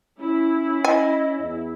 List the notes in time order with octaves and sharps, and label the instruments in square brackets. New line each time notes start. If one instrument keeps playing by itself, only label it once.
[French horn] C#4 [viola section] E4
[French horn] C#4 [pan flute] D#5 [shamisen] G#5
[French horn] E2